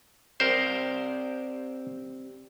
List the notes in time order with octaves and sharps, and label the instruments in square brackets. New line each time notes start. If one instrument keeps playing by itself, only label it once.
[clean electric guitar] C4 G4 D5 [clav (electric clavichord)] A#4 C5